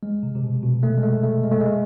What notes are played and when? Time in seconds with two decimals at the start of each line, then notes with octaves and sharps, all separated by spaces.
0.03 G#3
0.23 C3
0.35 C3
0.43 B2
0.63 B2
0.83 A3
0.98 G#3
1.03 A3
1.23 A3
1.43 G#3
1.52 A3
1.60 G#3